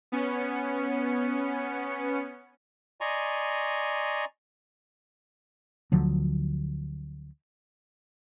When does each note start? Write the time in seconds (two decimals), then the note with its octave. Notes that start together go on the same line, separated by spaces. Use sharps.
0.12 B3 C#4 C#7
3.01 D5 D#5 G#5 A#5 C6 C#6
5.92 D2 D3 F3 F#3